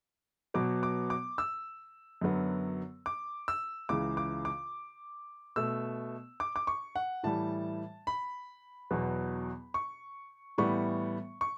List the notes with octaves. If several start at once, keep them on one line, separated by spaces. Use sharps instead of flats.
B2 F#3 B3 D6
D6
D6
E6
F#2 D3 F#3 B3
D6
E6
C#2 C#3 E3 D6
D6
D6
B2 A3 E6
D6
D6
C#6
F#5
A2 E3 G3 A5
B5
E2 B2 F#3 B3
C#6
A2 E3 G3 B3 C#6
C#6